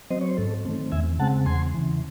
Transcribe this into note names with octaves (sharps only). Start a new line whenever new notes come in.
F#3 C4 C5 D#5
C#5
C5
G#2 A4
D#3 A3 C4
E2 E5 G#5
C#3 G#3 C4 F#5 A5
E2 G#5 C6
C#3 E3